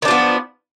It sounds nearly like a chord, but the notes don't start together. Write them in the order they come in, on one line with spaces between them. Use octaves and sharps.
D#3 D4 F3 B3